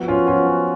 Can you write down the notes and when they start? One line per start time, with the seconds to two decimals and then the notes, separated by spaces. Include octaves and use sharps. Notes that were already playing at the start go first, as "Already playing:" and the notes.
Already playing: F3 B3 F#4
0.08 C#4 F4
0.27 C#4 F4
0.46 C#4